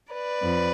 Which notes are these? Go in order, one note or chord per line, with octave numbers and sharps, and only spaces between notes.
B4 D5
F2